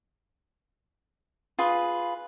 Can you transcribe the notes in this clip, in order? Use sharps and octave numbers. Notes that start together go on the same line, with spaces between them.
F4 G#4 B4